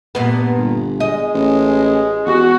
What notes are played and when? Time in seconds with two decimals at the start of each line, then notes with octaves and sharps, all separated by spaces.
0.15 G2 A#2 B3
0.57 G1
1.00 G#3 D#5
1.34 A1
2.26 E2 F#4